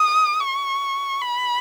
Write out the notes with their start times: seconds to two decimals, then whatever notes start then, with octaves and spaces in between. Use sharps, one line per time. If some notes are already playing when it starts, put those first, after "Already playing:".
Already playing: D#6
0.41 C#6
1.22 B5